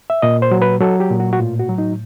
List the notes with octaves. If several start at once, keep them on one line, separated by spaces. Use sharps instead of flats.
E5
A#2 D#5
C5
F#3
B4
F#3 A4
G4
A#2
F#4
F#4
A2 F4
F#4
F#3
D#4